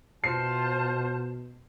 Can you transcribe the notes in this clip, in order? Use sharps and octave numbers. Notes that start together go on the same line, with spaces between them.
B2 F4 C5 A5 C7